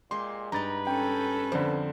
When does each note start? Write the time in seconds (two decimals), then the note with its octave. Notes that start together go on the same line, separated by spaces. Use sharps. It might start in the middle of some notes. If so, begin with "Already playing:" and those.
0.11 A#2 G#3 G4 C6
0.52 G2 D#4 B4 A#5 A6
0.87 C#4 A4 G5
1.52 F2 D3 C5